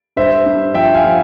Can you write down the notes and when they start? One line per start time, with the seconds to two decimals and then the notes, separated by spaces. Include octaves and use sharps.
0.16 G2 C5 E5
0.46 G2
0.74 F3 E5 G5
0.94 F5 G#5
1.04 F3